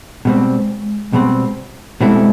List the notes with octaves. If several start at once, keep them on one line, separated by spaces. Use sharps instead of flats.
B2 G3 G#3 C4
B2 G3 C4
B2 G3 G#3 C4 E4 A4